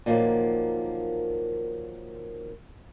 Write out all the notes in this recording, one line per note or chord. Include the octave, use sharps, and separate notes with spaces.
A#2 D#3 F3 F#3 A#3